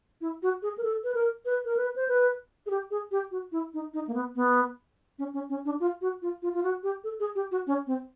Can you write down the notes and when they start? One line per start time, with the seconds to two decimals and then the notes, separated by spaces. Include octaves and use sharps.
0.21 E4
0.43 F#4
0.62 G#4
0.78 A#4
0.83 A4
1.04 B4
1.15 A#4
1.45 B4
1.65 A#4
1.77 B4
1.96 C5
2.08 B4
2.66 G#4
2.70 G4
2.91 G#4
3.11 G4
3.31 F#4
3.52 E4
3.74 D#4
3.94 D#4
4.07 A#3
4.14 B3
4.36 B3
5.19 C#4
5.33 C#4
5.49 C#4
5.65 D4
5.80 F4
6.01 F#4
6.22 F4
6.42 F4
6.54 F4
6.63 F#4
6.83 G4
7.04 A4
7.20 G#4
7.35 G4
7.51 F#4
7.67 C#4
7.87 C4